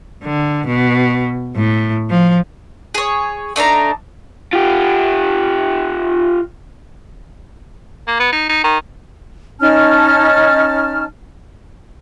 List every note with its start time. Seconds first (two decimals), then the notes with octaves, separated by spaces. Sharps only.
0.24 D3
0.67 B2
1.55 A2
2.10 F3
2.95 G#4 C#5
3.56 A3 D4 D#4 A#5
4.53 F4 G4
8.08 A#3
8.20 B3
8.32 D#4
8.49 D#4
8.64 D#3
9.60 C#4 D#4 A5 F6